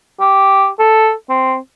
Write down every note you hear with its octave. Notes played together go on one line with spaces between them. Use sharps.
G4
A4
C4